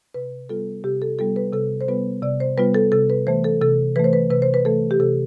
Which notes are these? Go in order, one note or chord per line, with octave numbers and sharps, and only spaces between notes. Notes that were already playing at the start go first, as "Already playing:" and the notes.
C3 B4
G3 B3 F4 A4
C3 G4
A4
G3 B3 F4 A4
B4
C3 A4
C5
G3 B3 F4 B4
C3 D5
C5
G3 B3 F4 B4
A4
C3 A4
B4
E3 A3 C5
A4
C3 A4
E3 A3 B4 C5
B4
C3 B4
C5
B4
E3 A3 A4
G4
C3 A4